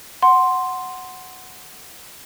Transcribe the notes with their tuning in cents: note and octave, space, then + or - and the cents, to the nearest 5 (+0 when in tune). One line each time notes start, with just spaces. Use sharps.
F#5 +0 C6 +0